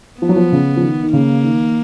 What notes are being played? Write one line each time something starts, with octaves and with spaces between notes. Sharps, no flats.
F3 B3
F#3
F3
C#3
F3
D#3
D#3
C#3 A#3
D#3